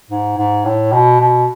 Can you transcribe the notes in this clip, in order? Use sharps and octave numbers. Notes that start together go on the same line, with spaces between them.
G#2
G#2
A2
B2
B2